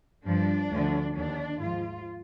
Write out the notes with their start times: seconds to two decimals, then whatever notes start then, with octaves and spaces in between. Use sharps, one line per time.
0.25 G2 F3 D4
0.71 D2 D3 F3
1.15 D#2 D#3 D4
1.60 G#2 F3 F4